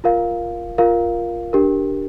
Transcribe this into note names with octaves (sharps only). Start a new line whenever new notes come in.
F4 A#4 F5
F4 A#4 F5
D4 G4 A#4